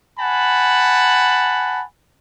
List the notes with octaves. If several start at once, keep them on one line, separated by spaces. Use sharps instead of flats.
F#5 G#5 A5 B5